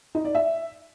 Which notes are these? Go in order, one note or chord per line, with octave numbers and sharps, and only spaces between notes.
D#4
D5
E5